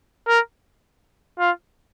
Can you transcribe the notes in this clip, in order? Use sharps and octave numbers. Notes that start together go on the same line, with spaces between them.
A#4
F4